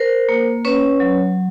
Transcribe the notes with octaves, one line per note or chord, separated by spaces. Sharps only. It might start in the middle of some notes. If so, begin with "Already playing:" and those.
Already playing: A#4 C5
A#3
C#4 B4 C#5
F#3